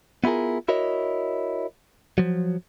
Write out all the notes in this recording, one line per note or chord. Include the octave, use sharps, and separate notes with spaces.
B3 E4 F4 G#4 A#4
E4 F#4 A#4 C#5 D#5
F3 F#3